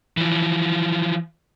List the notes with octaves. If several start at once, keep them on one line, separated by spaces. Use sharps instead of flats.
E3 F3